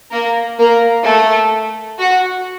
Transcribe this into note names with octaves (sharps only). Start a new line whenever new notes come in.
A#3 A#4
A#3 A#4
A3 A4
F#4